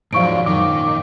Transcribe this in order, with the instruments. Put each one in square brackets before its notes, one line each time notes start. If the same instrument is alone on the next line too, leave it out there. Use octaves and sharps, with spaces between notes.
[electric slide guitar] G#2 F#3 [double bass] F3 D4 [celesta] F5 C#6 D7
[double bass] F#2 A#2 [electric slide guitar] D#3 [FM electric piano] D6